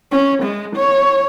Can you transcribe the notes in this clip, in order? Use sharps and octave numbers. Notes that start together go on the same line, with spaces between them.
C#4
G#3
C#5